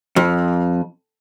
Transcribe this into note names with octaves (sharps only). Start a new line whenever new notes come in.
F2